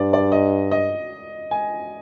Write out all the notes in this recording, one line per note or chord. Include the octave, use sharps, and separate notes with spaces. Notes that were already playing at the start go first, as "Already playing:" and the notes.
Already playing: G2 D5
D5
D#5
D#5
G#5